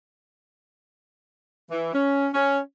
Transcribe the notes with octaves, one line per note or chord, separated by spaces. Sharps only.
E3
C#4
C#4